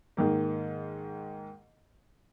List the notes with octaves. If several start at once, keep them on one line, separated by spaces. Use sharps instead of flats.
G#2 D#3 A#3